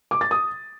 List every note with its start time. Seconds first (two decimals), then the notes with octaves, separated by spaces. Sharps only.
0.11 D6
0.21 A6
0.31 D#6